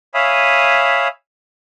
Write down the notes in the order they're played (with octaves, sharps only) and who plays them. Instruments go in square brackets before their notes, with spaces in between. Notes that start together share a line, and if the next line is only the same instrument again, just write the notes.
[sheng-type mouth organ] C#5 E5 F5 G#5 B5 D#6